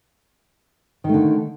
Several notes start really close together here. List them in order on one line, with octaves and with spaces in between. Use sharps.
D#3 A3 D3